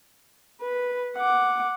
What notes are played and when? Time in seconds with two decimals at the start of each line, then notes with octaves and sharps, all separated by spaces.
0.61 B4
1.17 F#5 D6